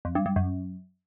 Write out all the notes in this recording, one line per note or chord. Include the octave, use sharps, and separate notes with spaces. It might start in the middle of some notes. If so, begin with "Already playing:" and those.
F2
G2
G2
F#2